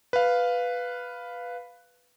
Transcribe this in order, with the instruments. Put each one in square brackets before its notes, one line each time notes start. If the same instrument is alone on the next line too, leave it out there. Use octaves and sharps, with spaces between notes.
[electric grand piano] B4 F5